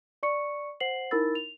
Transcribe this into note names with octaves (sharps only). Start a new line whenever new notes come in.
D5 C#6 C#7
C5 F#5 C7 F#7
D#4 E4 A#4 B5 E6 A6
F7